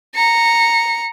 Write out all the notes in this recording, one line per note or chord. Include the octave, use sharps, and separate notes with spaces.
A#5 C#7